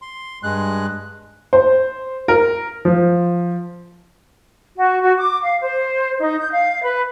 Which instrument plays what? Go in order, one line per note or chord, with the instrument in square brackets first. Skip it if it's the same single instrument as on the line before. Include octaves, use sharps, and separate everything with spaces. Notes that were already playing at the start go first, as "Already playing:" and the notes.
[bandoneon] C6
G2 G#3 F#6
[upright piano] C5
A#4
F3
[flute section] F#4
F#4
D6
F5
C5
D#4
G6
F5
B4